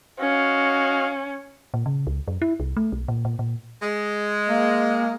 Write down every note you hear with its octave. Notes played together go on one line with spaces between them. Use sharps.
C#4 F#4 D#5 F5
A#2
C#3
C#2
F#2
E4
C2
A3
B1
A#2
A#2
A#2
G#3
A#3